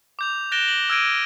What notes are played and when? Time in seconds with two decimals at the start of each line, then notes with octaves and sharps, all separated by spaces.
0.19 D6 G6 F7
0.52 F#6 A6 A#6 D7 E7 G7
0.68 F#7
0.90 E6 F6 G#6 A#6 D7 D#7